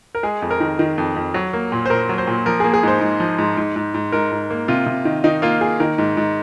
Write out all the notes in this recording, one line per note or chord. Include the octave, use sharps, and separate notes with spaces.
A#4
G#3 G#4
F2
A#4
D#3
D#3
F2
F2
F#3
A#3
A#2
C5
A#2 A#4
F#3
C5
A#2
F3 A#4
A#3 G#4
G#4
G#2 C5
G#2
F3
G#2
G#2
G#2
G#2
G#2 A#4
G#2
A#3
C3 F4
C3
D#3
D#3 D#4
A#3 F4
A#3 G#4
D#3 A#4
G#2
G#2